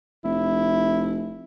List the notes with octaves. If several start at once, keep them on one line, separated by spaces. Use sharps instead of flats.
F1 E4